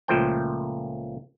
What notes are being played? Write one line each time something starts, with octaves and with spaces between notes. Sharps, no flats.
C#2 A#2 F3 A3 C5 G5